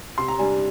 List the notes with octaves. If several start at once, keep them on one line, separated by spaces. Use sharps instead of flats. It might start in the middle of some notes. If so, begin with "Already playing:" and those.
C3 C6
A#5
G3 D4 G#5